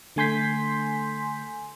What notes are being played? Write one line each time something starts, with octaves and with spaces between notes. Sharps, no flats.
D3 A3 G#5 C6 G6 B6